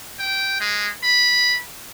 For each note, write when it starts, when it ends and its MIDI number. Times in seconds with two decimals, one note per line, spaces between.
0.19 0.60 79
0.60 0.87 56
1.04 1.58 83